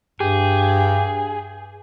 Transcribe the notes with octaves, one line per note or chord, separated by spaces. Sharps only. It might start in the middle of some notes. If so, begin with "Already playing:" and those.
G2 G4 G#4